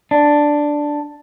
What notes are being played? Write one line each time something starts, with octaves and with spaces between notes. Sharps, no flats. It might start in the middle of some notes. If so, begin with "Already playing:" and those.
D4